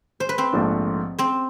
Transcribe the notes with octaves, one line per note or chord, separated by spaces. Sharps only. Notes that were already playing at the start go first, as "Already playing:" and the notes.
C5
B4
C4 C5
A#1 G#2 F3 A3 D4
C4 C5